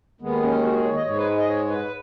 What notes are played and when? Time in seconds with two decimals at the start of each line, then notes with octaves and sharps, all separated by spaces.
0.21 D#2 D#3 G#3 B3
0.43 C#4
0.64 F#4
0.74 G#4
0.85 C#5
0.95 D#5
1.06 G#2 G#3 C#5
1.17 B4
1.38 D#5
1.48 C#5
1.70 B4